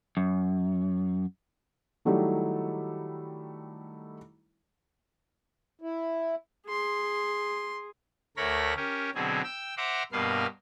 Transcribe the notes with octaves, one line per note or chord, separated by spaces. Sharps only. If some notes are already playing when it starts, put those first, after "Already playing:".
F#2
D#3 F#3 G3 A3 D#4 E4
E4
G#4 C6
D2 A3 A#4 C#5 B5 A#6
C#4 G4 A#4
B2 D3 F#3 C4 G#4
G5 E6
C5 E5 F#5 A#5 C6 D6
G2 B2 A#3 B3 F5 C6